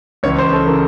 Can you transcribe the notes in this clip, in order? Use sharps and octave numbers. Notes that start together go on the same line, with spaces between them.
C#2 C#3 E3 C#5
C5
A4
C#3 E3 A#4